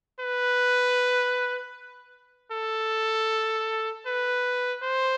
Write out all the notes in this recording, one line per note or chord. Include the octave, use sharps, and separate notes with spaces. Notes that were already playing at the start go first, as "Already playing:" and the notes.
B4
A4
B4
C5